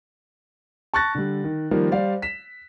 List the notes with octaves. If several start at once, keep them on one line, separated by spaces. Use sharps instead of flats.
A5 C#6 F#6 A6 A#6
D3 G3
D#3
D#3 F3 G3 A#3
G3 C5 D5 F5
B6 E7